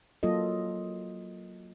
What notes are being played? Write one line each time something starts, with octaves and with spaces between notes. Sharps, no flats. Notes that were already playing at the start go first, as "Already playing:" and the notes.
F#3 A#3 F4 A4 D#5